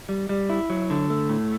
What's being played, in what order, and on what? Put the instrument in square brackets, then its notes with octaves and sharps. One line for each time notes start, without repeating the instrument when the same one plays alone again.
[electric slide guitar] G3
G3
E4
F#3
D3
A3
A2